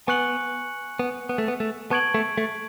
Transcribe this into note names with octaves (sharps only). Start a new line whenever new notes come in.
B3 G#5 C#6 F#6 C#7 F#7
B3
B3
A3
B3
A3
B3 A5 C#6 G#6 D7 F#7
A3
A3